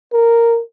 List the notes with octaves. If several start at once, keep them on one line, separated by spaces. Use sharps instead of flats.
A#4